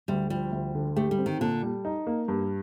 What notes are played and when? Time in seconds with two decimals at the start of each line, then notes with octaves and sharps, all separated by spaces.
0.08 D2 G3
0.30 F3 G3
0.52 D2
0.75 D3
0.96 A3 G4
1.11 G3
1.18 C4
1.26 D#3
1.40 A#2 D3
1.63 G3
1.85 D#4
2.07 A#3
2.28 G2